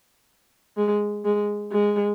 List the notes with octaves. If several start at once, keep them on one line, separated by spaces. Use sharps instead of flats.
G#3
G#3
G#3